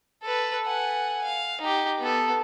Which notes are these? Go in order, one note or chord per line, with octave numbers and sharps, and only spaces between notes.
A4 B4
F#5 G#5
F5
D#4 G4
B3 A4